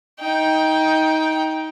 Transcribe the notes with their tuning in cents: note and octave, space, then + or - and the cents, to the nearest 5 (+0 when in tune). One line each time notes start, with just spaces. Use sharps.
D#4 +20 G5 +0